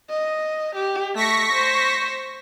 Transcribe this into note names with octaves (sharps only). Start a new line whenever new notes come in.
D#5
G4
A3 C#6 A#6 B6
C5